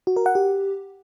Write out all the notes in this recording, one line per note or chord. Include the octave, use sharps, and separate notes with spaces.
F#4
A#4
F#5
G4